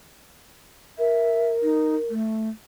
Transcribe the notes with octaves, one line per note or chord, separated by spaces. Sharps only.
A#4 E5
D#4
A3